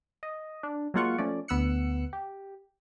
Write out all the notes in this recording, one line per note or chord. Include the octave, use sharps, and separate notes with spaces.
D#5
D4
F#3 G#3 A#3 F4 F#5 C#6
F3 A3 C#4 D5
D2 B3 E6 F#6 C#7
G4